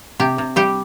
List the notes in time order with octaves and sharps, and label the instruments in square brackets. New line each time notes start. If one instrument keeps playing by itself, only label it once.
[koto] C3 G4
C3
G3 G4